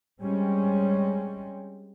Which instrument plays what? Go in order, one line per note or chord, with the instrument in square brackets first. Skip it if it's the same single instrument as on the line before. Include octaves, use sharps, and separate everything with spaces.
[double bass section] G3 G#3 C4 C#4